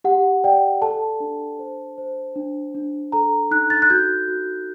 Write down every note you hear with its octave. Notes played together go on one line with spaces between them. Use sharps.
G4 F#5
D5 G5
A4 A5
D4
C5
C5
D4
D4
A4 A#5
D#4 F#6
A6
F#6
F#4 G6
F#4